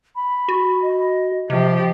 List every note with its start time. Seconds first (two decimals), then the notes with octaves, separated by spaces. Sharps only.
0.15 B5
0.48 F#4
0.82 D#5
1.50 C3 F3 G4 D#5